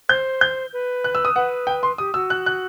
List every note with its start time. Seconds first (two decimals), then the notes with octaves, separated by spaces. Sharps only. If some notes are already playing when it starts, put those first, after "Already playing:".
0.09 C5 G6
0.41 G6
0.73 B4
1.04 F#6
1.15 E6
1.25 D#6
1.35 B4 F#5
1.67 G5
1.83 C6
1.98 G4 D#6
2.14 F#4 E6
2.30 F#6
2.46 F#6